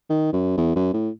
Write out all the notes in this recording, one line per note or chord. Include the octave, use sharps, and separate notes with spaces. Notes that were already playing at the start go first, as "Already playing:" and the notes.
D#3
F#2
E2
F#2
A2